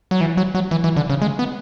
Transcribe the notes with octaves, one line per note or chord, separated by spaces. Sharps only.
F#3
E3
F#3
F#3
E3
E3
D3
C#3
G#3
B3